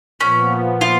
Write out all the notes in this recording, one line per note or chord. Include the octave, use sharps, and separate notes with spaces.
A#2 F3 B3 C#4
F4